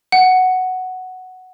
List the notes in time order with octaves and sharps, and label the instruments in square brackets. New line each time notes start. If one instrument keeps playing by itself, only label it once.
[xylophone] F#5